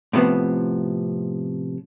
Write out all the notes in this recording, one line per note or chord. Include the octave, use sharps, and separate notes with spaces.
A2 C3 F3 B3